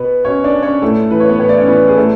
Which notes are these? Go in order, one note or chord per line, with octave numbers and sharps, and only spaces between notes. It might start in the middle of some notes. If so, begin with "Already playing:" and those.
Already playing: B2 B3 B4
B2 C#4 C#5
D4 D5
C#4 C#5
A2 A3 A4
E3 B4
C#5
B3 B4
A2 C#5
D5
C#4 C#5
E3 B3 B4
G#4
A2 A3 A4